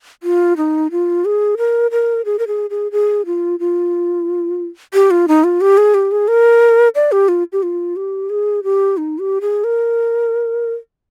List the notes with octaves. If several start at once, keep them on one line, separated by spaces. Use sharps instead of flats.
F4
D#4
F4
G#4
A#4
A#4
G#4
A#4
G#4
G#4
G#4
F4
F4
G4
F4
D#4
F4
G4
G#4
G4
G#4
A#4
D5
G4
F4
G4
F4
G4
G#4
G4
D#4
G4
G#4
A#4